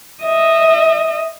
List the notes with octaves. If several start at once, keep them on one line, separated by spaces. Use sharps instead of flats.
D#5 E5